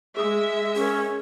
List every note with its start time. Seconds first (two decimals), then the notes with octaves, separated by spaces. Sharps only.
0.17 G#3 G#4 E5 D#6
0.76 C#4 G#4 A#4